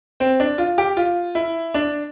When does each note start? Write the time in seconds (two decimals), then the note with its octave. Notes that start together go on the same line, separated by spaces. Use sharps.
0.20 C4
0.40 D4
0.58 F4
0.78 G4
0.97 F4
1.35 E4
1.74 D4